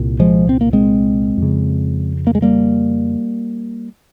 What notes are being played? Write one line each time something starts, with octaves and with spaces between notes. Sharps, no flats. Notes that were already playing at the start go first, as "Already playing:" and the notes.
Already playing: C2 A#2
F3 G#3
C4
A#3
G#3 C4
F2
C#3
A#3
G#3
G3 A#3